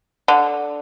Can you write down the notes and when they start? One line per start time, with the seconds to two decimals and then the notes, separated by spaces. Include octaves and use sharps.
0.28 D3